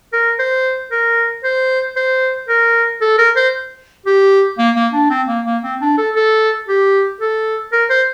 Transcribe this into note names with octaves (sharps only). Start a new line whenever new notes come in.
A#4
C5
A#4
C5
C5
A#4
A4
A#4
C5
G4
A#3
A#3
D4
C4
A#3
A#3
C4
D4
A4
A4
G4
A4
A#4
C5